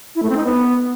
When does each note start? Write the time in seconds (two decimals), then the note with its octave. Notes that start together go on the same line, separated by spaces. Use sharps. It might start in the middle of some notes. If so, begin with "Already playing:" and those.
0.15 E4
0.23 A3
0.30 C4
0.37 D#4
0.44 B3